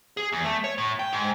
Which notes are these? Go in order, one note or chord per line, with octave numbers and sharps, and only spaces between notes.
G#4
E2
A3
C#5
A2
G5
G#2